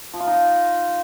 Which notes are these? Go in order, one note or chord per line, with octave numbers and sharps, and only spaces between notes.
F3
F4
D#4